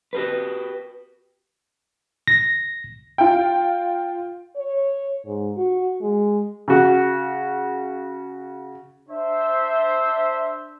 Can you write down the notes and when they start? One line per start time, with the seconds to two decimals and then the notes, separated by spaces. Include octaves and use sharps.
0.13 F#4 G4 B4
2.28 A#6
3.18 F4 G5
4.56 C#5
5.25 G#2
5.57 F#4
6.01 G#3
6.68 C#3 F#4
9.09 D4 C5 E5